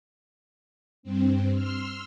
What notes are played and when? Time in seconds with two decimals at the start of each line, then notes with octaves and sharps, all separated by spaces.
1.03 G2 C4
1.54 C6 E6 F6